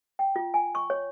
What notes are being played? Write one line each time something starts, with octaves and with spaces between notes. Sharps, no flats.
G5
F4
G#5
C#6
C#5